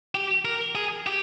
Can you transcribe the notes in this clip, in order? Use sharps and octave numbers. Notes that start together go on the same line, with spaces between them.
G4
A#4
G#4
G4